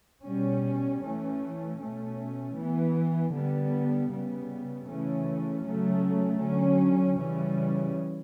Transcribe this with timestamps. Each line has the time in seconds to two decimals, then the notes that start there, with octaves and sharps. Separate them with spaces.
0.24 B2 G3 C#4
1.01 E3 A3 C#4
1.79 B2 A3 C#4
2.55 E3 B3
3.33 D3 G3 B3
4.10 C#3 G3 B3
4.87 C#3 E3 A3 C#4
5.64 C#3 F#3 A3 C#4
6.41 D3 F#3 C#4
7.18 C#3 E3 G3 C#4